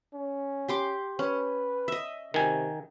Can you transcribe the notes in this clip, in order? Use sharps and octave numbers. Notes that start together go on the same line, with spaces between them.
C#4
G4 C6 D6
C#4 B4
D#5 E5
C3 D#3 G#5